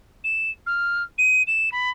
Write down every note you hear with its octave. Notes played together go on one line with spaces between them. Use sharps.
E7
F6
D#7
E7
B5